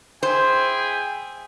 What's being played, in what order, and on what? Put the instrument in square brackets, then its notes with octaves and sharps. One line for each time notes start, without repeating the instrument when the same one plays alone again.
[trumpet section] E4 G#4 G5 [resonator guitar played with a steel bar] C5